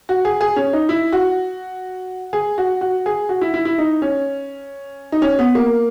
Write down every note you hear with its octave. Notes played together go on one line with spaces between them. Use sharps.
F#4
G#4
G#4
C#4
D#4
E4
F#4
G#4
F#4
F#4
G#4
F#4
E4
E4
E4
D#4
C#4
D#4
C#4
B3
A#3